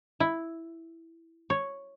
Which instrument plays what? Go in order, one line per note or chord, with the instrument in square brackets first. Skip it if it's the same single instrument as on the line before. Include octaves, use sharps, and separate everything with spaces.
[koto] E4
C#5